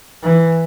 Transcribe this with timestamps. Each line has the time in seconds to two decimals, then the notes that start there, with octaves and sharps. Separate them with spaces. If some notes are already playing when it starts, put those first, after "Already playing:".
0.23 E3